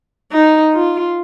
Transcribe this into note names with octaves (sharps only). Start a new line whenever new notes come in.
D#4
F4